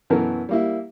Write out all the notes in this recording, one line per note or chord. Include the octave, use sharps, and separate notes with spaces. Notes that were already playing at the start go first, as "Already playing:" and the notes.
F#2 B2 E3 A4 A#4
G3 A#3 E4